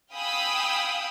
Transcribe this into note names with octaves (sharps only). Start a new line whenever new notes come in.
F5 G5 G#5 B5 D#6 E6